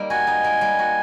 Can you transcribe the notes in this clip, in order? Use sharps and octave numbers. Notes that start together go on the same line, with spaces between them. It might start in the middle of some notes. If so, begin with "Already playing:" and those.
Already playing: G3 A#3 D#4
F#4 G#5
D#4
A#3
G3
F#4